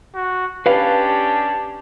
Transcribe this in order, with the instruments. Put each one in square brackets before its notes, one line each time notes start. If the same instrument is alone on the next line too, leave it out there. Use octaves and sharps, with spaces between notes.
[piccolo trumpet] F#4
[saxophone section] C#4 D4 G4 [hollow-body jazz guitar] B4 F5 [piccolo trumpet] A5